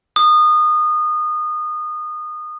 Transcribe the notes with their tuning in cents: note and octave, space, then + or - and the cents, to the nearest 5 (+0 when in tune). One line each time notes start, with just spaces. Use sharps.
D#6 -25